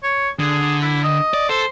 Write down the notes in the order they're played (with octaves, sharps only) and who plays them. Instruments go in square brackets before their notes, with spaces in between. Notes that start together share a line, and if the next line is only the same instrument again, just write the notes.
[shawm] C#5
[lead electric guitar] D3 [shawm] G#4
[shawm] E4
D#5
[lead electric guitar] D5
[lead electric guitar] A4 [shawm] C5